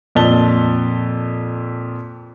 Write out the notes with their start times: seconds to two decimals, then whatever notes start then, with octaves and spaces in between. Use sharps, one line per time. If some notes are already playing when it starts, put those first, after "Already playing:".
0.15 F2 A#2 A5 G7